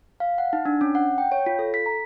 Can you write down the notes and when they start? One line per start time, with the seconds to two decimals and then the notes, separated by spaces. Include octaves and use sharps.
0.20 F5
0.38 F#5
0.53 D#4
0.65 D4
0.81 C#4
0.95 F#5
1.18 G5
1.32 C#5
1.46 F4
1.59 A4
1.74 B6
1.86 A#5